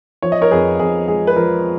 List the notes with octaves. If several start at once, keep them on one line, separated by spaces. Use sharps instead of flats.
F3 C#5
D#5
A#4 C#5
F2 G#4 B4
F2 G#4
G#3 G#4
B4
F3 A#4